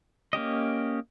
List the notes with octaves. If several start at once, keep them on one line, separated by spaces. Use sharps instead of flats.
A#3 C#4 G4 D#5